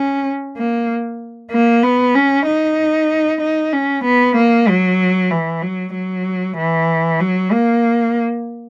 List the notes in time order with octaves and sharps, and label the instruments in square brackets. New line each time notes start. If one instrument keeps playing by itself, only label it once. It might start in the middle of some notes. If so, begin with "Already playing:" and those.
Already playing: [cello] C#4
A#3
A#3
B3
C#4
D#4
D#4
C#4
B3
A#3
F#3
E3
F#3
F#3
E3
F#3
A#3